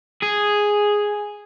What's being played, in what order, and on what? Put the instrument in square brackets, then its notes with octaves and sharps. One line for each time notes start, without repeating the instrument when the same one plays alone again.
[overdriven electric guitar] G#4